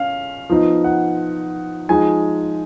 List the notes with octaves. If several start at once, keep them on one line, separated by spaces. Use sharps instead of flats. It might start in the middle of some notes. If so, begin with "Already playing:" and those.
Already playing: C#4 F5
F3 B3 D#4
F#5
F3 G#3 D#4 G#5